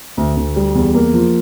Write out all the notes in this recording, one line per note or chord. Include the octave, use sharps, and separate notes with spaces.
D2
D2
G3
E2
A#3
F3